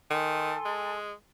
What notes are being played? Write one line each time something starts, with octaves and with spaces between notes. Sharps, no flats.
D#3 A4 G#5 C6
G#3